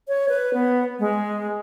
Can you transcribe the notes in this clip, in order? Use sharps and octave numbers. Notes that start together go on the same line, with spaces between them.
C#5
B4
B3
G#3